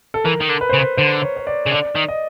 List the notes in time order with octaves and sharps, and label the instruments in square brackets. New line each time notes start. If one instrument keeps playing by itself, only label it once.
[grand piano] A4
[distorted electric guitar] E3 [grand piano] A#4
[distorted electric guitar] D#3
D3
[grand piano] B4
C5
[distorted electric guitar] C#3
[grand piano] B4
[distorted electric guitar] D3 [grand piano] C5
[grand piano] C#5
C#5
D5
[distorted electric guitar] C#3
[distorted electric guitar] D3 [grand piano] D5
[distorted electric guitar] D#3
[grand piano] D#5